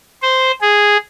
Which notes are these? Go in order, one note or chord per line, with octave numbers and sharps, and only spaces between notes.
C5
G#4